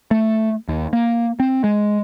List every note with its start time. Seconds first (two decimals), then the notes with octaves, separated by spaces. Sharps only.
0.11 A3
0.68 D#2
0.93 A#3
1.40 C4
1.64 G#3